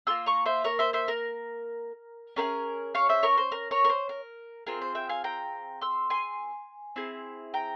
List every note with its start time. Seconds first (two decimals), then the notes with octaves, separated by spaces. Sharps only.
0.07 A#3 F4 G#4 C6 E6
0.26 A#5 C#6
0.46 C5 E5
0.64 A#4 C#5
0.79 C5 E5
0.93 C5 E5
1.08 A#4
2.36 C#4 E4 G#4 A#4
2.95 C#5 F5
3.09 C5 E5
3.23 A#4 C#5
3.37 C5
3.52 A#4
3.71 A#4 C#5
3.84 A#4
3.89 C5
4.09 A#4
4.67 C4 F4 G#4 A#4
4.81 C5
4.95 E5 G5
5.09 F5 G#5
5.24 G5 A#5
5.81 C6 E6
6.10 G#5 C6
6.96 C4 E4 G#4
7.54 G5 A#5